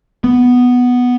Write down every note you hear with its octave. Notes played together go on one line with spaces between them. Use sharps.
B3